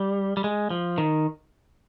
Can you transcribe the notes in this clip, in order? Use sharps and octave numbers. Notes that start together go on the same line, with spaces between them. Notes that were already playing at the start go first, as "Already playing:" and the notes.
Already playing: G3
G3
G#3
F3
D#3